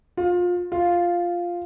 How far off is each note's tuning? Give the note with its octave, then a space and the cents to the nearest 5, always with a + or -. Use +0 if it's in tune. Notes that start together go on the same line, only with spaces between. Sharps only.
F4 +25
F4 +0